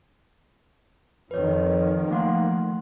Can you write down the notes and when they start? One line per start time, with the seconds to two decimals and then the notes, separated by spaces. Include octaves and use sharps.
1.31 F2 D#3 F3 B4 C#5
2.11 A3 A#3 F#5 C6